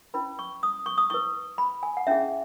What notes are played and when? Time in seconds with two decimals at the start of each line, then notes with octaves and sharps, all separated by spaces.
0.14 C#4 E4 B4 B5
0.39 C#6
0.63 D#6
0.86 C#6
0.98 D#6
1.10 E4 B4 C#6
1.58 B5
1.83 G#5
1.97 F#5
2.07 C#4 E4 G#4 E5